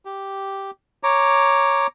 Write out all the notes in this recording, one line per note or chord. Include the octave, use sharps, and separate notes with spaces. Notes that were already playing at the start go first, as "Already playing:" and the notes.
G4
C#5 A#5 D6